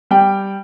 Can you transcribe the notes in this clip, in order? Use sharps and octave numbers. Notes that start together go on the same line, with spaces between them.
G3 G5